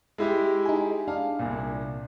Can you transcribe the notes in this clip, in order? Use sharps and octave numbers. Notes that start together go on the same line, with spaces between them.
G#3 E4 G4
D#4 G#4
D4 F5
C2 A#2